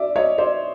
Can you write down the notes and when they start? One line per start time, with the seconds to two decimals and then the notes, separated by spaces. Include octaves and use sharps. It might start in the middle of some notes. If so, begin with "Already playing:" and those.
Already playing: D5 E5
0.16 C#5 D#5
0.38 C5 D5